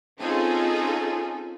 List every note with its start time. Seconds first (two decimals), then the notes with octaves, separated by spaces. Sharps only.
0.20 C4 C#4 D#4 F4 G#4 A4